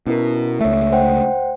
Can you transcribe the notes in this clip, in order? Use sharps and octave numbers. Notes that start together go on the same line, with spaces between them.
B2 C#4 E4 A#4
C#2 A3 C#5 E5
C5 F#5 G5